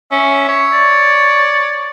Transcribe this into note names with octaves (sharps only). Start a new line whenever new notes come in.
C#4 E5
C#5
D5